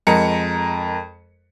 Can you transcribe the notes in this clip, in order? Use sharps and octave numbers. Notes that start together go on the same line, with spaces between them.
F2 G#3 A#4 C#7